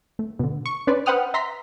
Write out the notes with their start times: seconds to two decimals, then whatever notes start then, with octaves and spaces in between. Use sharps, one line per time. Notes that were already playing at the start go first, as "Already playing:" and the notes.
0.19 A3
0.39 B2 D3
0.66 C#6
0.87 C#4 D4 B4 C5 D5
1.06 B4 C5 F#5 G5 D#6 F6
1.34 E5 A#5 C6 B6